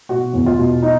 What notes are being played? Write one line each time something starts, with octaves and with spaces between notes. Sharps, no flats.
B2 F#4
E2
F4
B2
D#4